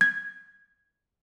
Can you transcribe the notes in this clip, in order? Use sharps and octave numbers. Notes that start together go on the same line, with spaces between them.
G#6